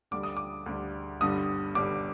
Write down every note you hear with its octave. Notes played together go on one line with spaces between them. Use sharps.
D2 D3 G3 D6
D#6
D6
D2 D3 G3
G1 G2 D3 G3 D#6
G1 G2 D3 G3 D6